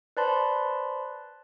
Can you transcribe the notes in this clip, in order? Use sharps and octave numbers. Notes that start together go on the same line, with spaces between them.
B4 C5 D5 A5 B5 C6